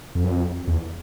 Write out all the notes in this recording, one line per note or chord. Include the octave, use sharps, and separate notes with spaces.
F2
F#2
F2
E2